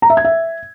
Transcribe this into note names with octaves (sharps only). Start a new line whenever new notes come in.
A#5
E5
G#6
E5